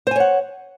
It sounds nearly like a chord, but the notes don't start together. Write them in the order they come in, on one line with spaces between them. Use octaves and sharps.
C5 G#5 C#5 F#5